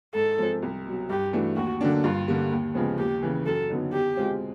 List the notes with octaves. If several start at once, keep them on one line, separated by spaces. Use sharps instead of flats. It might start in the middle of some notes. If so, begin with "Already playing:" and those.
G#2 A4
F3 G#3 C4
C2
B2 F#3
G2 G4
E3 A3 D4 F#4
D#2 F#4
D3 F#3 A#3 D4
G2 F4
D3 G3 A#3
D#2
C#3 F3 G#3 B3
D#2 G4
C#3 E3
F#2 A4
D3 F#3 B3 D#4
E2 G4
B2 G#3 C4 F4